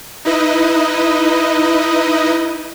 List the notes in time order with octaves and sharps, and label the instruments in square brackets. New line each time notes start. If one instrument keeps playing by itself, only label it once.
[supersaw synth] D#4 E4 B4 D#5